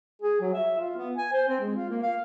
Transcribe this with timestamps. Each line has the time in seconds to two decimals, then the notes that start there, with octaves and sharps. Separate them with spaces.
0.22 G#4
0.41 F#3
0.54 E5
0.78 F4
0.97 B3
1.17 G#5
1.32 C5
1.48 C4
1.60 G#3
1.75 F4
1.90 A#3
2.03 F5